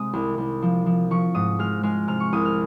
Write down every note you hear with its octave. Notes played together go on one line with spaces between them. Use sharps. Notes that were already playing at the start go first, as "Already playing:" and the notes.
Already playing: C3 G#3 D#6
C2
C2
F3
F3
F3 C#6
G#2 D#6
G#3 F6
G#3 F6
C3 F6
C#6
C2 D#6
F6